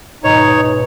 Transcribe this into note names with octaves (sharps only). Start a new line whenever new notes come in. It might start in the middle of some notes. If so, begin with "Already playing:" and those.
D#1 G#2 B2 D#4 C#5